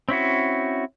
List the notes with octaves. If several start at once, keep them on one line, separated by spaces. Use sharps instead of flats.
C4 C#4 E4 F#4